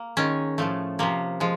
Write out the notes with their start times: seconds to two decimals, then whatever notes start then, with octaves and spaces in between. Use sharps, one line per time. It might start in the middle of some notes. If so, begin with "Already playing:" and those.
Already playing: A#3
0.17 D#3 G#3 C#4
0.58 A2 F3 A3
0.99 C3 F3 A#3
1.40 F3 G#3